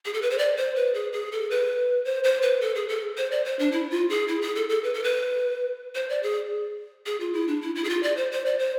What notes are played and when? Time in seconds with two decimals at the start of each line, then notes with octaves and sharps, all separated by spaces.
0.05 G#4
0.14 A4
0.22 B4
0.30 C5
0.38 D5
0.57 C5
0.76 B4
0.94 G#4
1.13 G#4
1.32 A4
1.51 B4
2.05 C5
2.24 C5
2.42 B4
2.61 A4
2.75 G#4
2.89 A4
3.17 C5
3.31 D5
3.45 C5
3.59 D4
3.72 E4
3.91 F4
4.09 G#4
4.28 E4
4.42 G#4
4.56 A4
4.69 A4
4.83 B4
4.94 A4
5.04 B4
5.95 C5
6.09 D5
6.23 G#4
7.06 G#4
7.20 F4
7.33 E4
7.48 D4
7.62 E4
7.75 E4
7.84 G#4
7.89 F4
8.03 D5
8.17 C5
8.32 C5
8.46 D5
8.59 C5